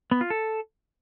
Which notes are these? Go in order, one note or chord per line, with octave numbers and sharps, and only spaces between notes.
B3
F4
A4